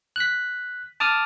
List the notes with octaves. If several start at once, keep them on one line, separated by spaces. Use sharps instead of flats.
F#6 B6
A5 D6 D#6 F6